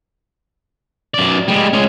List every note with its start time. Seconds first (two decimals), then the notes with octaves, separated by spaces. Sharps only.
1.14 F#2 D5
1.48 G3 G#3
1.73 G#3 C#4